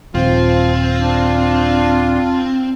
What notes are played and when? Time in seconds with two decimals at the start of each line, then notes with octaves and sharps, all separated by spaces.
0.15 D#1 F3 C4 F4
0.99 D4